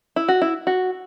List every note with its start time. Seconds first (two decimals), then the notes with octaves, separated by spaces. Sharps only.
0.16 E4
0.28 F#4
0.41 E4
0.67 F#4